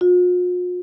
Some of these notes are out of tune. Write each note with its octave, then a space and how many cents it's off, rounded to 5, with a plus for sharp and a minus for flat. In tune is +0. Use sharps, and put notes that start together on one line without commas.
F4 +45